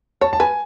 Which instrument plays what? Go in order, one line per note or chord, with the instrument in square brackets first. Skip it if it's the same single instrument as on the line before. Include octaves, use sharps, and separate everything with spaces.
[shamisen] C#5 [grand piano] A5
[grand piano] A5
[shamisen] B4 [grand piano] G#5